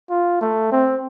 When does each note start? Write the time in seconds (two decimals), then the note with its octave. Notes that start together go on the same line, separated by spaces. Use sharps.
0.10 F4
0.41 A3
0.72 C4